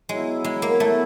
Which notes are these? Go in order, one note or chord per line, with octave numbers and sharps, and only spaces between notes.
F#3 G#3 B3 E4
G#3
A#3
F#3 A3 B3 E4